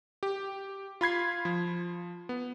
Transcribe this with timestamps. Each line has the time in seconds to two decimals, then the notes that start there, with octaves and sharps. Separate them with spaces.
0.23 G4
1.01 F4 B5 G#6 C7
1.45 F3
2.29 B3